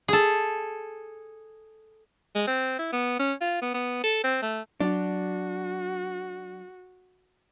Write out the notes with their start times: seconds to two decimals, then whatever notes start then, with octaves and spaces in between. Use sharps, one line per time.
0.08 G#4 A4
2.35 G#3
2.47 C4
2.79 E4
2.93 B3
3.19 C#4
3.41 F4
3.62 B3
3.74 B3
4.03 A4
4.24 C4
4.42 A3
4.80 F#3 D4 F#4